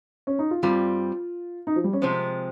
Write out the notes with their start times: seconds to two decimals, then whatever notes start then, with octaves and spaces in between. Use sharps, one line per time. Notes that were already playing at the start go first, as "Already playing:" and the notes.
0.27 C#4
0.39 D#4
0.51 F4
0.63 G2 G3 C4 F4
1.67 D#4
1.76 F3
1.84 G3
1.93 C#4
2.01 C3 F3 G#3 C4